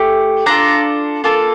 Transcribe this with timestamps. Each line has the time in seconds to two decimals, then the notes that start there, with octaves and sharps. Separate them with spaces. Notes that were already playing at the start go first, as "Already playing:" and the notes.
Already playing: A3 G4
0.46 D4 F4 A4 A#5
1.24 A#3 F4 A4